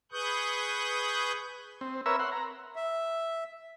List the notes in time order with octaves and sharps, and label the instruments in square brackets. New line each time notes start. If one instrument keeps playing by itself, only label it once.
[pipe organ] G#4 B4 C#6 D#6 F#6 G6
[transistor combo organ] C4
A#4 B4 C#5 E5 E6
F#5 C6
A#5
[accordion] E5